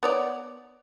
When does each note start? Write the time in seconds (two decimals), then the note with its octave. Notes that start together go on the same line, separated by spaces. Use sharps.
0.03 B3 C#5 D5